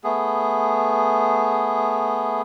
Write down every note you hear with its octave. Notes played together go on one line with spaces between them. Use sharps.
A3 B3 G#4